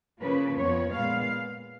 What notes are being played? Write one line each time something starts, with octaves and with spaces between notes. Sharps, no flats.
C#3 F3 A#3 B4
F2 F3 B3 C#5
A#2 G#3 B3 F5